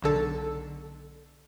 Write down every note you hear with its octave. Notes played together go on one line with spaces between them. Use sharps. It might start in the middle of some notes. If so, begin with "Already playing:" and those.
B1 D3 A4